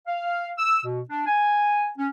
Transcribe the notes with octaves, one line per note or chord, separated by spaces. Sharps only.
F5
E6
B2
D4
G#5
C#4